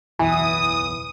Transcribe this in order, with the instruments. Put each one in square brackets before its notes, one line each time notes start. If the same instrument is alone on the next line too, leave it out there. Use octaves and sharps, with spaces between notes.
[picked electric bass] F#1 B1 E2 [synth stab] E3 [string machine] D#6